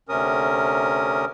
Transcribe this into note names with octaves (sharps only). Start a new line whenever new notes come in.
D2 C3 C#4 A#4 D#6